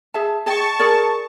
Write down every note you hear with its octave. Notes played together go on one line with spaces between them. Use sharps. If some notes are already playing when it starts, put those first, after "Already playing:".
G#4 E5 A5
G#4 D#5 G5 A5 C#6
G#4 A#4 D5